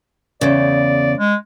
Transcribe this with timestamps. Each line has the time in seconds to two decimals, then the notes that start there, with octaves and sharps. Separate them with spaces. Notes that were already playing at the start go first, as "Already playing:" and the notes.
0.41 E2 C#3 D5
1.19 G#3